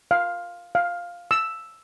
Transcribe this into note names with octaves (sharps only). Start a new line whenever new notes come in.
F5
F5
E6